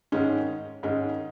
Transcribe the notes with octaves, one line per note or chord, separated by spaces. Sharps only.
G#2 D#3 G#3 C#4
G#2 D#3 G#3 C#4